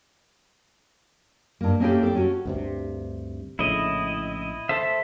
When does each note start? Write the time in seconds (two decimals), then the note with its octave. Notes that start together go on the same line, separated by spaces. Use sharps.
1.61 G2 A#3
1.80 A#3 C4 C#4 E4 G4 A4
2.03 A4 G5
2.15 C#4 F#4 A4
2.45 D2 G2 C3
3.59 A#1 A2 C#3 E4 D#5
4.69 A4 C5 E5